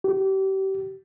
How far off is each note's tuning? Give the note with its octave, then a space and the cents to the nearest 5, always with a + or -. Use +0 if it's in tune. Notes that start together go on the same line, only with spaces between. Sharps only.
G4 -30